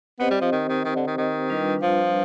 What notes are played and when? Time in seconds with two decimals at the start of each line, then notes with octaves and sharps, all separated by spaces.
0.19 B3 C4 G4 C5 D#5
0.31 G3
0.41 F3
0.52 D#3
0.69 D#3
0.85 D#3
0.96 D3
1.07 D#3
1.18 D#3
1.50 G3 D4 F4 B4
1.82 F3